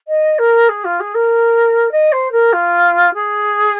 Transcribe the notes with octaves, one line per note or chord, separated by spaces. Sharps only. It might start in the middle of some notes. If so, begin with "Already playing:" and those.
D#5
A#4
G#4
F4
G#4
A#4
D#5
C5
A#4
F4
G#4